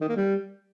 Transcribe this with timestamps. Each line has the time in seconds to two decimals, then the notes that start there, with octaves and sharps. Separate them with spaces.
0.01 D#3
0.09 A#3
0.16 G3